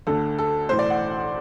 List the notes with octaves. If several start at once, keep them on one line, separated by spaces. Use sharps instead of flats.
D2 D3 A4
A4
B1 A2 E3 C5
D5
F#5